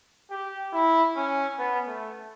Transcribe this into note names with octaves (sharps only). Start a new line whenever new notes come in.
G4
E4
C#4
B3
A3